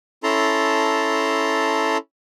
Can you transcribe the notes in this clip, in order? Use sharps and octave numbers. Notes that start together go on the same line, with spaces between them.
C#4 E4 A4 A5 A#5 C6